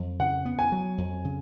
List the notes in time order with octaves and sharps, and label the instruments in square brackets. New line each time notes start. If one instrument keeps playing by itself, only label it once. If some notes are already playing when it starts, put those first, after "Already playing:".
Already playing: [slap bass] F2 F#3
[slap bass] C#3 [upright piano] F#5
[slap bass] B3
[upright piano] G#5
[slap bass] F#3
F2
C#3